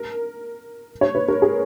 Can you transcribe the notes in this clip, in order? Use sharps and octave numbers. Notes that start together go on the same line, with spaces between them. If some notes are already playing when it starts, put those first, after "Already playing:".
Already playing: A#4
C#5
B4
A#4
G#4